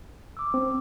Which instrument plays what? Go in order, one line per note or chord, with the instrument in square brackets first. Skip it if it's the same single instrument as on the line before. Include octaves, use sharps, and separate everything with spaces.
[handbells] D6 E6
[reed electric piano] C4